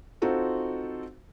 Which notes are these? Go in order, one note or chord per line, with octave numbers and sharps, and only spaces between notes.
C4 D#4 F4 F#4 A4 C5